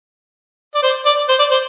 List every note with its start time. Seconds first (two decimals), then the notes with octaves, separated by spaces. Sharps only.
0.75 D5
0.83 C5
1.06 D5
1.29 C5
1.39 D5
1.51 C5